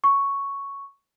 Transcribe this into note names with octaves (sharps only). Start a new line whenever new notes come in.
C#6